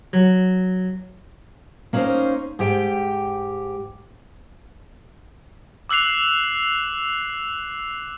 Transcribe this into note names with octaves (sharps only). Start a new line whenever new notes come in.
F#3
A#3 C#4 D#4 A4 C5
G#2 G4 G5
D6 E6 F#6 C7 F7